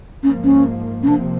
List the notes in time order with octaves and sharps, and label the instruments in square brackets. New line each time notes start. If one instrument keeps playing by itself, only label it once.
[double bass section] G#2 F3 A#3 [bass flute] C#4
[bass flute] C#4
C#4
[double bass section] C3 F3 A#3 [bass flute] D4